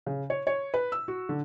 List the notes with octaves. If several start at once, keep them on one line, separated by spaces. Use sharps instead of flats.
C#3
C#5
C#5
B4
E6
F#4
D3